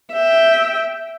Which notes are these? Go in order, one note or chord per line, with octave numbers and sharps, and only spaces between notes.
E5 G5